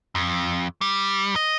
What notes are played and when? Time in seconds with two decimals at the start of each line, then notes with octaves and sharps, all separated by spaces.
0.15 F2
0.81 G3
1.36 D#5